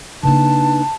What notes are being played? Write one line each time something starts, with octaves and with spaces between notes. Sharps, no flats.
C#3 A#3 D4 D#4 B4 A5